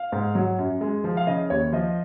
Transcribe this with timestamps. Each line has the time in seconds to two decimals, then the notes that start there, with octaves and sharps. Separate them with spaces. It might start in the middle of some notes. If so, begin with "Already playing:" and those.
Already playing: F5
0.12 G#2
0.35 F#3
0.59 F#2
0.81 G#3
1.04 F3
1.17 F5
1.27 C#3 D#5
1.50 D#2 C#5
1.72 F3 D#5